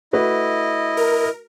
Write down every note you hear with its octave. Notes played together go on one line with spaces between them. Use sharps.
A3 E4 F#4 B4 D#5
A#4